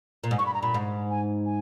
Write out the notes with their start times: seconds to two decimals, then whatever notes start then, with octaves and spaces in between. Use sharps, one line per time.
0.24 A#2
0.31 G#2
0.38 G2 C#6
0.46 B5
0.54 A#5
0.62 A#2 B5
0.74 G#2
1.11 G#5
1.46 G#5